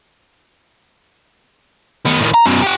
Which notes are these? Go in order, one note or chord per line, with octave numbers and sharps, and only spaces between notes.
D#3 B3
A2 D#3
A#5
F#2 B2
G4 F#5